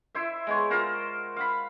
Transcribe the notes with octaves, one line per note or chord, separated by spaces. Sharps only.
E4 C5 E5
G#3 B3 C#5
F4 A#4 C5 F#5
F5 F#5 B5